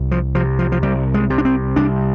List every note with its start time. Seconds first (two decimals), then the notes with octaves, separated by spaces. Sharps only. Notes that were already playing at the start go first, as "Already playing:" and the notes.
Already playing: C2
0.11 F3
0.35 C3 F3
0.59 F3
0.72 F3
0.82 C2 G3
1.14 G#3
1.30 C3
1.38 D4
1.45 C4
1.76 C2 D4